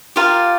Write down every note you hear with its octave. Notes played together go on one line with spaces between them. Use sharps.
F4 G4 A#4 D5 F5